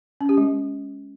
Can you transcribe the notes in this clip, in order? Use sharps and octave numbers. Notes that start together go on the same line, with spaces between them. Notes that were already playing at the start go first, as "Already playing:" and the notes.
C#4
G4
G#3